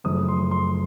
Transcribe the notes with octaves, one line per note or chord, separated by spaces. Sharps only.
F#1 F#2 F3 A3 D#6
C6
C6